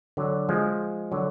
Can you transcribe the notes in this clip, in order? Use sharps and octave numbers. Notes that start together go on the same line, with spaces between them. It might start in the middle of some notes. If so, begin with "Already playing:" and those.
D3 F#3
F3 G#3
D3 F#3